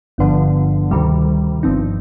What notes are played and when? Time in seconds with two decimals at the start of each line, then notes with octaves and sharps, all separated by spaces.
0.18 G1 G2 D3 F3
0.91 D2 C3 D#3 G3
1.63 G1 G2 F3 C4 D#4